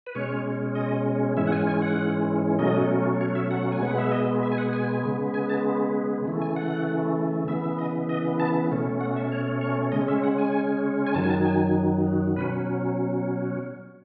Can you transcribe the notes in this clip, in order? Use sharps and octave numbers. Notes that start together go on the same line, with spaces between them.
B4
B2 G#3 C#4 C#5
D#5
G#2 E3 G#3 C#4 E5
F#5
G#5
G#5
F#5
B2 F#3 A3 C#4 D#5
C#5
E5
F#5
G#5
B2 G#3 B3 F#5
E5
D#5
E5
G#5
F#5
G#5
C#3 G#3 B3
G#5
A5
C#3 E3 A3
G#5
F#5
C#3 E3 B3 E5
E5
D#5
D#5
A5
B2 A3 C#4
F#5
E5
C#5
C#5
C#3 G#3 C#4 D#5
E5
F#5
G#5
G#5
F#2 D#3 F#3 A5
G#5
A5
G#5
B2 F#3 C#4 B4